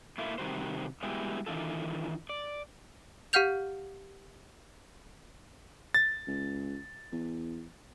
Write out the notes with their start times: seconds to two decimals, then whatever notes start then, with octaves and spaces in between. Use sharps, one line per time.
0.18 A3 A#3 E4 F4
0.38 C3 D#3 G3 F#4 C5
1.03 G3 G#3 B3 E4 F#4 G4
1.46 D#3 E3 D4 F4 A4
2.29 D5
3.33 G4 F5 F#5 F6 G6 F7
5.94 A6
6.27 C#2
7.12 E2